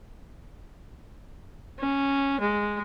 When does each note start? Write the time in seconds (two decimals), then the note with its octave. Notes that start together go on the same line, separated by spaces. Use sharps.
1.80 C#4
2.41 G#3